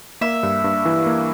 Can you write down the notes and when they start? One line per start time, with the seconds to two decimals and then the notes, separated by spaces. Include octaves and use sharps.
0.21 A#3 E5
0.43 G2
0.64 G2
0.85 E3
1.06 A#3